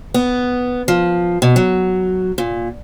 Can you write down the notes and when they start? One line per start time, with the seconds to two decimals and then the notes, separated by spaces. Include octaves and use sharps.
0.14 B3
0.88 F3
1.42 B2
1.56 F#3
2.38 A#2